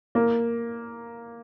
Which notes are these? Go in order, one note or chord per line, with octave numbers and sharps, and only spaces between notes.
A#3